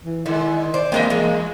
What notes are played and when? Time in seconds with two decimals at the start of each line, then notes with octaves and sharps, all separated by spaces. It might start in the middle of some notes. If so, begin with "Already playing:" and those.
0.05 E3
0.26 D3 D#3 G#3 E4
0.74 C5 D5
0.92 F#2 E3 G#3 A#3 C4 C#5 D#5
1.10 E2 G#3 A#3